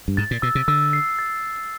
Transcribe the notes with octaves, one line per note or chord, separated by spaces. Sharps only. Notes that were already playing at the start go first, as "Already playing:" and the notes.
G2
G#2 A6
A#2
B2 E6
C3
D3 E6
C7
A6